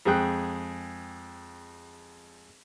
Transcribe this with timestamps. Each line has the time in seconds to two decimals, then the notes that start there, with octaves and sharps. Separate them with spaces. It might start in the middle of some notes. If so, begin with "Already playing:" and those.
0.05 F2 G#3 G#4 G5 F#6